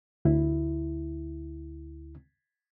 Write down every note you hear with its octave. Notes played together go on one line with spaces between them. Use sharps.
D2 E4